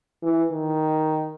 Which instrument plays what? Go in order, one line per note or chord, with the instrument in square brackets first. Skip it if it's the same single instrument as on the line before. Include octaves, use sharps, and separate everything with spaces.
[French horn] E3
D#3